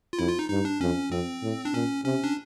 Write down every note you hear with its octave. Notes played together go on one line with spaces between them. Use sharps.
F4
F2 E4
F4
D#4
G2 D#4
D4
F2 C#4
F2 C4
A2
D4
A#2 C#4
C3 C#4
D4